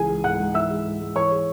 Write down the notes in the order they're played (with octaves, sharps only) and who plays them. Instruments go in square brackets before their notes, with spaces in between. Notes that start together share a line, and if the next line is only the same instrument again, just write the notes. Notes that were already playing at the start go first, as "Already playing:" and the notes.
Already playing: [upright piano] C#2 E3 G#4 G#5
G#3
G#2 F#5 F#6
G#2
E3 E5 E6
G#3
G#2
G#2
E3 C#5 C#6
G#3